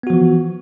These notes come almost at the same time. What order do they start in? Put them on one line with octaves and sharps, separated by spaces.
B3 F#4 F3 E3